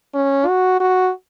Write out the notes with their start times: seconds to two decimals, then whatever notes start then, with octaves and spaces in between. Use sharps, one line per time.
0.14 C#4
0.47 F#4
0.80 F#4